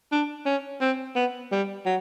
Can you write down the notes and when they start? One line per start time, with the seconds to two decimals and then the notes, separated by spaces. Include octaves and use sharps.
0.12 D4
0.46 C#4
0.81 C4
1.15 B3
1.52 G3
1.86 F#3